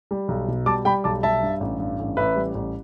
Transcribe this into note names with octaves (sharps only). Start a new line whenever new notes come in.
G3
B1
B2
G3 A5 D6
G3 G5 B5
B1 A5 D6
G3 E5 A5
G2
A1
G2
A1
A1 B4 E5
G3
A1